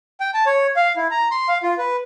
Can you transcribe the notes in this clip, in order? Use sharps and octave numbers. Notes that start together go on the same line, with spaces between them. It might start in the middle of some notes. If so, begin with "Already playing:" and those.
G5
A5
C#5
F5
E4
A#5
C6
F5
F4
B4